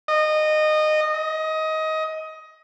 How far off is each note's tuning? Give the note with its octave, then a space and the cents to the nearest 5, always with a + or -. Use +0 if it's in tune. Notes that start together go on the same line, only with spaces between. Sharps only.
D#5 -20
D#5 +20